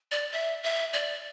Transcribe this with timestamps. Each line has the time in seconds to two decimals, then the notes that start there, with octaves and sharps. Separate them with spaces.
0.11 D5
0.32 E5
0.64 E5
0.93 D5